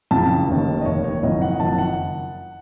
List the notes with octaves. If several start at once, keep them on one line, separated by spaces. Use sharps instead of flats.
F#1 F2 C#3 A5
F1 D#2 D#3
D#5
F1 D#2 D#3 C#5
C#5
F#1 F2 D#3 D#5
F#5
F#1 F2 D#3 A5
F#5